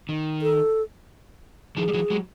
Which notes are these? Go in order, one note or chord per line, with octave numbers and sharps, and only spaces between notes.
D#3
A4
D#3 F3 G#4
G3
E3 F#3
F#3 G#3